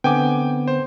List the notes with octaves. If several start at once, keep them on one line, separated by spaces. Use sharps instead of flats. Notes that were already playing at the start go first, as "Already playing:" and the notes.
D3 B3 C4 G5 G#5 D6
C5